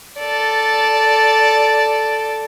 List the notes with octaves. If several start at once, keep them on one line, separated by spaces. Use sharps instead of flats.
A4 D5